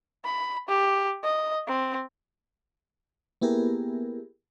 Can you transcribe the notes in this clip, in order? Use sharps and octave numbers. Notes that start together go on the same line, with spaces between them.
B5
G4
D#5
C4
A#3 B3 E4 G4 G#4 A#4